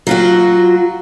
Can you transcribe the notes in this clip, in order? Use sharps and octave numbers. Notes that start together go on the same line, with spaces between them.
F#3 F4 F#4